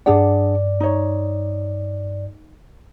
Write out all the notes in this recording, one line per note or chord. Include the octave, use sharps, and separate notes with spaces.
G2 D4 G#4 D5 F#5
D#4 C#5